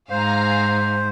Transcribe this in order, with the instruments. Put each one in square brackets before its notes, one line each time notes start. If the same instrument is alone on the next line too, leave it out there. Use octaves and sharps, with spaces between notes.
[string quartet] G#2 [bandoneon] C5 [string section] F5 G#5 A#5